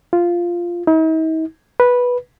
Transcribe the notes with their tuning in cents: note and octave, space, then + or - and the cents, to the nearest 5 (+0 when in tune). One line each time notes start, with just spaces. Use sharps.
F4 -5
D#4 +45
B4 -10